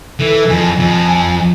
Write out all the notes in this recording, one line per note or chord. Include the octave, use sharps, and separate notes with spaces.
E3 A4
F2 G#5
F2